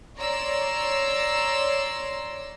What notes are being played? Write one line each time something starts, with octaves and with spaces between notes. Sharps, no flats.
C#5 D5 A#5 C6 E6